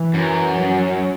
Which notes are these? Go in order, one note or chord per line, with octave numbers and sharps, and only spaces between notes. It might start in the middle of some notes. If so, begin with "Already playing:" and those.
Already playing: E3
F#2
F#3